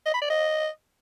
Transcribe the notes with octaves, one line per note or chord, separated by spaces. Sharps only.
D#5
B5
D5
D#5